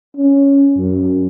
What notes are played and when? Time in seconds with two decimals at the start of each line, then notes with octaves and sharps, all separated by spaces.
0.17 C#4
0.77 F#2